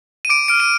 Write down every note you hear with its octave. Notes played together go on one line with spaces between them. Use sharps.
D#7
D6 D7
F6 D7
D#7